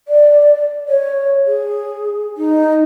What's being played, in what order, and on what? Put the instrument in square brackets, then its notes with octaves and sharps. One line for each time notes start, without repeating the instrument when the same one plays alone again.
[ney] D5
C#5
G#4
D#4